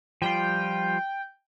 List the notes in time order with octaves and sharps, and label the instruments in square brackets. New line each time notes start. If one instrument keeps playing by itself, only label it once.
[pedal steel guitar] F3 G3 F4 [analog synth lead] G5